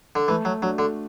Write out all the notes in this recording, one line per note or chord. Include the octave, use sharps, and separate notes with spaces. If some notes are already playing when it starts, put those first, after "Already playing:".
D3
E3 A3
F#3
F#3 D4 F#4
D3